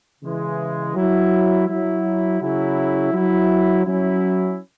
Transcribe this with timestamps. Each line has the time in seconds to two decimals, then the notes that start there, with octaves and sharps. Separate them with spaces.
0.22 C#3 E3 G#3
0.94 F#3 E4
1.67 F#3 E4
2.40 C#3 F#3 C#4 E4
3.13 F#3 E4
3.85 F#3 C#4 E4